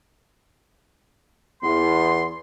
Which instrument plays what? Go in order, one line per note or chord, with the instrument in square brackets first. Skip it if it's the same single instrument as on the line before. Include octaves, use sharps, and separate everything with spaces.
[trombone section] E2 B3 [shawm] C6